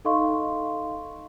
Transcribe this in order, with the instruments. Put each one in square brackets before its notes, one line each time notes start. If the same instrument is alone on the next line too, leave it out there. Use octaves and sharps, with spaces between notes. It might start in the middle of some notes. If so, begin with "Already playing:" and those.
[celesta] D#4 A4 D#5 F5 C6 C#6